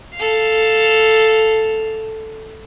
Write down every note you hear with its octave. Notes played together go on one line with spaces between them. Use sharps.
A4 F5